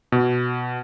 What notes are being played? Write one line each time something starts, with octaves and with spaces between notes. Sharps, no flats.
B2